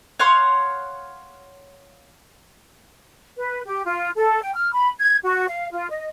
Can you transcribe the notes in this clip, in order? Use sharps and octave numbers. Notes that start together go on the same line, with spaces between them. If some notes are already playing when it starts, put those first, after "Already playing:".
C#5 F5 F#5 C6
B4
G4
F4
A4
G5
F6
B5
G#6
F#4
F5
F4
D#5